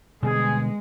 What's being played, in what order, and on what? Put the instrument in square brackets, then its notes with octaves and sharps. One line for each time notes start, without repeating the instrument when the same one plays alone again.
[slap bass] B2 D3 G3 [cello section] G#3 [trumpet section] G#4